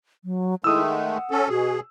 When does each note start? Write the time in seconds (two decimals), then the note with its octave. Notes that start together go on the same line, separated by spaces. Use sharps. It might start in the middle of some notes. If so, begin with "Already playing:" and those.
0.25 F#3
0.64 D#3 G#3 A3 E4 D#6 E6
0.88 F#5
1.31 C#4 A4
1.49 B2 F#4 G#4